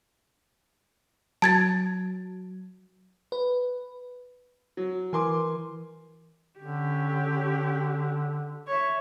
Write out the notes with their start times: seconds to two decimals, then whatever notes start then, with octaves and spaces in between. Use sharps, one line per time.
1.42 F#3 A5 G#6 A6
3.32 B4
4.77 F#3
5.13 E3 A#4 G#5 C6 D6
6.60 D3 C#4 G4
8.67 C#5 E5